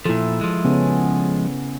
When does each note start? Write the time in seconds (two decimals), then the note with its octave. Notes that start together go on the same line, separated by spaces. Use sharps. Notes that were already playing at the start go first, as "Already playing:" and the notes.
0.06 A#2 F3 E4 A4
0.41 F3 G#3
0.65 C#3 B3 C#4